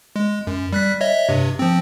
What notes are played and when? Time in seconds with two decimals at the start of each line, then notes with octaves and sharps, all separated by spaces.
0.16 G#3
0.47 F#2
0.73 G3 F#6 B6
1.01 C#5 D#5 E5
1.29 G2 C3
1.59 F3 C4